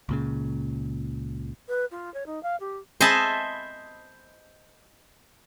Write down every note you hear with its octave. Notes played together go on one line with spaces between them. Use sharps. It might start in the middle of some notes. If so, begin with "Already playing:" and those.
C#2 A#2 C#3
B4
F4
C#5
D#4
F5
G4
C5 D#5 E5 G#5 A5 B5